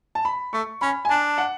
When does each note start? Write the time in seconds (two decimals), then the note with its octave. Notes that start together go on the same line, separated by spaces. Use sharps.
0.15 A5
0.25 B5
0.53 A3 C#6
0.81 C#4 B5
1.05 G#5
1.09 D4 A5
1.38 F#5